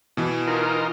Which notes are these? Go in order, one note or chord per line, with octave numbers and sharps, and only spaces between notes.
B2 E3
D#4 F4 A#4